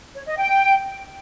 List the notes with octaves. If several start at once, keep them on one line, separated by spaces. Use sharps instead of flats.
C#5
D#5
G5